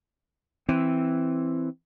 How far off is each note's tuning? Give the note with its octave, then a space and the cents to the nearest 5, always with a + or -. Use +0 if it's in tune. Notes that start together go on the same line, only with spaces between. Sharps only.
E3 +0 C4 +0